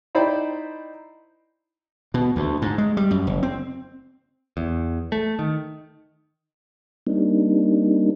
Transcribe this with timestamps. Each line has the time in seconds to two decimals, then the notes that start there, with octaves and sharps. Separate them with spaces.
0.15 D#4 E4 C5 D5 G5 B5
2.14 B2
2.36 D2
2.62 G#2
2.78 G#3
2.97 G3
3.11 F#2
3.27 F#1
3.43 C4
4.57 E2
5.12 A3
5.39 D#3
7.07 G3 A#3 C4 D4 D#4